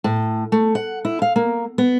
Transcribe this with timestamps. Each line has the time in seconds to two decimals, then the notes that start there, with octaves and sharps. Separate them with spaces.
0.04 A2
0.52 A3
0.75 F#5
1.05 E4
1.22 F5
1.36 A#3
1.78 B3